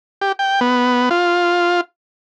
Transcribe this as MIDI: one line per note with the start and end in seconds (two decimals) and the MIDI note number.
0.21 0.32 67
0.39 0.60 79
0.61 1.09 59
1.11 1.81 65